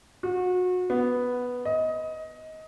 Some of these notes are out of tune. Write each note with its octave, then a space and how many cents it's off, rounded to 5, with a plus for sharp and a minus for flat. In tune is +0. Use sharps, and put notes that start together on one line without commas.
F#4 -30
B3 +0
D#5 +20